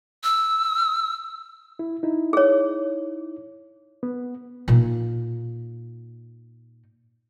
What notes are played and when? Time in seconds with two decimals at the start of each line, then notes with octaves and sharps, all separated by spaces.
0.24 E6
1.79 E4
2.03 D#4 E4
2.33 G#4 C#5
4.03 B3
4.68 A#2 D#4